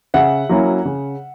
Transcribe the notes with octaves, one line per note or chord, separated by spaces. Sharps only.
C#3 E5 F#5
F#3 A#3 C#4 E4
C#3